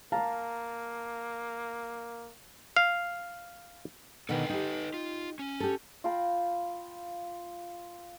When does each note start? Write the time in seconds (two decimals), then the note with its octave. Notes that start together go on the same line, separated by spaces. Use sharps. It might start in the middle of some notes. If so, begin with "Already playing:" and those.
0.12 A#3 F5 A5 A#5
2.76 F5
4.29 B2 D3 D#3 A4 B4 G5
4.49 D#4 G4
4.94 F4
5.39 C#4
5.60 G4 A4
6.04 F4 G5 A#5 B5